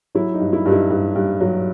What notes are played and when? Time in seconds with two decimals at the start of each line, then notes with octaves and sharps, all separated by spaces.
0.15 F#3 E4
0.34 D#4
0.40 G2
0.53 E4
0.65 G2 D#4
0.72 E4
0.90 G2
1.15 G2
1.40 F#3